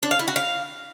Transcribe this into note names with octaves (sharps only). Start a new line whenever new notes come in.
D4
F5
E4
F#4
F5